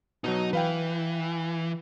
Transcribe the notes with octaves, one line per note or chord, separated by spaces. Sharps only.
B2 F#3 D#4 D#5
E3 B4 F5 G5